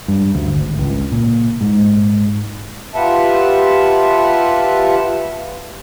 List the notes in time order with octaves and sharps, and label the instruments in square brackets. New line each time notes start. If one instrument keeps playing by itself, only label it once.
[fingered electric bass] G2
D2
G#1
C#2
A#2
G#2
[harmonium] F4 G4 B4 E5 F#5 A5